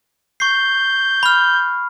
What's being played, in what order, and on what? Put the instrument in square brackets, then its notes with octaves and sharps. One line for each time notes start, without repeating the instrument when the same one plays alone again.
[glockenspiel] C#6 C7 [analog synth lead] G6
[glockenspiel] B5 F6